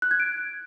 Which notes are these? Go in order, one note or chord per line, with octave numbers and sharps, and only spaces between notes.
F#6
G#6
D7